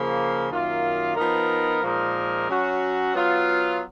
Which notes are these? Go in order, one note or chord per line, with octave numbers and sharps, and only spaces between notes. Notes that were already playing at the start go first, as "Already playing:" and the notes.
Already playing: C#3 F3 A#3
F#2 D#3 A#3 F4
F3 B3 D#4 A#4
A#2 F3 G#3 D#4 A#4
F#3 C#4 F#4
F#3 B3 F4